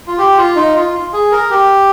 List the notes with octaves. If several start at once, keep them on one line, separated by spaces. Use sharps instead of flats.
F4
G4
F4
D#4
F4
G#4
A#4
G4